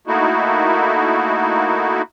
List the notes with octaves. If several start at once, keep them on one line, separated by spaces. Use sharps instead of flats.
A3 A#3 D#4 E4 F#4